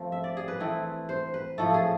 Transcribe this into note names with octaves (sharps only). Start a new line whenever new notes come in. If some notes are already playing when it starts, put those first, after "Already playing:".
Already playing: F3 A3 C4
E5
D5
G#4
B4
E3 A3 C4 E4
C5
B4
A2 F3 A3 A4
G#4 A4